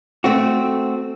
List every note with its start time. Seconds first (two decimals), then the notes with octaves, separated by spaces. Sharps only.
0.24 A3 C4 F#4